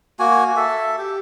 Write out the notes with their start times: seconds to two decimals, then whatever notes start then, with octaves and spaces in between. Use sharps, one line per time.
0.19 A#3 F#4 G#5
0.57 A4 E5
0.98 G4